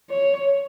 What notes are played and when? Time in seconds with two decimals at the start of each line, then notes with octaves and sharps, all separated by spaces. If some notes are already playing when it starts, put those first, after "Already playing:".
0.10 C#5